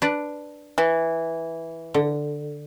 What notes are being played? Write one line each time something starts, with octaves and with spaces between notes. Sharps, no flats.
D4 B4 D5
E3
D3